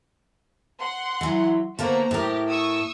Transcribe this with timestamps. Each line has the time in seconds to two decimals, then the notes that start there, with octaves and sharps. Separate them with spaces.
0.78 F#5 C6
1.21 E3 F#3
1.79 D3 A#3 B3 F#4 C5 A#5
2.11 A2 G4 A#4
2.50 C#6 D#6 E6